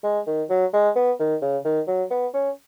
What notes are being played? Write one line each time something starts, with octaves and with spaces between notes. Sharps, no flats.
G#3
D#3
F#3
G#3
B3
D#3
C#3
D#3
F#3
B3
C#4